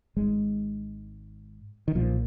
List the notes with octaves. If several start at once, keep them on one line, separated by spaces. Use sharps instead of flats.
G#1 G#2 G#3
D#3
B1 A#2 F3